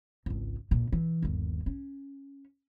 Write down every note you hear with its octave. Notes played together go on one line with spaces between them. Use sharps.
G#1 C#2
D2 A#2
E3
G1 D#2
C#4